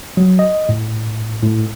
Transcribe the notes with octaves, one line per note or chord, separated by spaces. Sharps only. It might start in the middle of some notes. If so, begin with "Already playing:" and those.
F#3
D#5
A2
A2